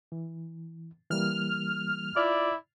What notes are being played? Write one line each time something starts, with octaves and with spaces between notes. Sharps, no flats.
E3
E3 G3 A#3 F6
E4 F4 D5